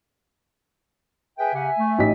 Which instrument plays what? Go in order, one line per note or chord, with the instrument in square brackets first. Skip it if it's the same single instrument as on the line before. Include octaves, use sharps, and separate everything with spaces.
[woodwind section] G#4 B4 G5 [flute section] E5 G#5
[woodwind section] C#3 G4 F#5
A3
[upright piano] A1 D#4 B6